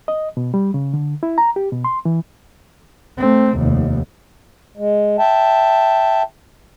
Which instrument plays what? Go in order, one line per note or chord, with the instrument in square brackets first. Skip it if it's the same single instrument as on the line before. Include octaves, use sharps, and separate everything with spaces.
[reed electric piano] D#5
B2
G3
C#3
D3
E4
A#5
G4
B2
C6
E3
[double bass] A3 C4
F1 D#2
[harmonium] G#3
E5 G5 A5